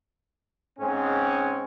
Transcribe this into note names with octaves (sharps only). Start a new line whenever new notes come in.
G#2 G#3 C4 C#4